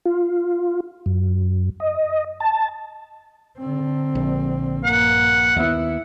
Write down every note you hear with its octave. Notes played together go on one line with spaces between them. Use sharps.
F4
F#2
D#5
A5
D3 C4
A#1
G2 A#3 F#5
D#2 B3 E4